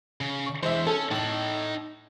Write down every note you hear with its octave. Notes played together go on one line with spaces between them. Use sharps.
C#3
C#6
E3 G#3 C5 E5
C#4 A4
A2 D#4 A5 F#7